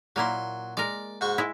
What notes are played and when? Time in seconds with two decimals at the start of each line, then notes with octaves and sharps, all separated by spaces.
0.16 A#2 F#3 A#3 E4 C6
0.77 G#3 A#4 D5
1.21 G#2 F#4 C#6
1.38 G#3 E4